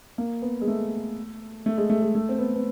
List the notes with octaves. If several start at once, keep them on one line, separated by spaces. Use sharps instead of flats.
A#3
B3
G#3
A3
A3
G#3
A3
G#3
A3
C4
B3
B3